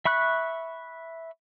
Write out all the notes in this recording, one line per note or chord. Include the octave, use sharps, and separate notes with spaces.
E5 B5 C#6 F#6